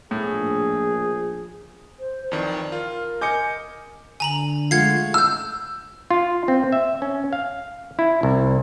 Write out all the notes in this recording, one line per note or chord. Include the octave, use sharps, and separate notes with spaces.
A#1 A2 G#4
C5
F2 D#3 E3 D5
F4 A#4
D#5 G#5 D6 G6 C#7
D3 G#5 A#5 F#7
G#3 A3 F4 F#5 G#6 C7
E6 F6 G6
F4
C4
E5
C#4
F5
E4
C2